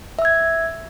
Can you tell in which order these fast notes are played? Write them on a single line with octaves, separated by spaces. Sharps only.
E5 E6 G#6